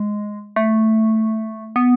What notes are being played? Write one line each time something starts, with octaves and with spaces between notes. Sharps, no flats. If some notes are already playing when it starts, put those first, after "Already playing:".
Already playing: G#3
A3
B3